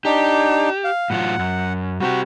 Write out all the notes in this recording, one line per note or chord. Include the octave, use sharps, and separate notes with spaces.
D4 D#4 G4
F5
A2 F#3 F4 F#5
F#2
G3 C4 F#4 G4